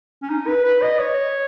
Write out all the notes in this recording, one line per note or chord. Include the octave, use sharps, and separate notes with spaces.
C#4
D#4
B4
B4
D#5
C#5